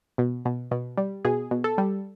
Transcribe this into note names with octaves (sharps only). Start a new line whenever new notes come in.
B2
B2
B2
G3
B2 G#4
B2
A4
G3